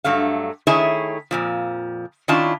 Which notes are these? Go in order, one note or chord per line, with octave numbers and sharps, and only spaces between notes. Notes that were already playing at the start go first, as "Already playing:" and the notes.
G2 F#3 A3 F5
D#3 A3 E4 G#4 C#5 E5
F2 A#2 F3
D#3 C#4 D4 E4 F4 A5